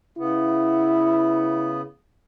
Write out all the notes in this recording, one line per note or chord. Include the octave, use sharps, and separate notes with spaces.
C#3 B3 E4